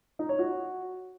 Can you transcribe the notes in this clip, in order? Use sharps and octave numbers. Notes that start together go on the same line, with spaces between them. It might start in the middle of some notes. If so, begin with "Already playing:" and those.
D#4
C#5
F#4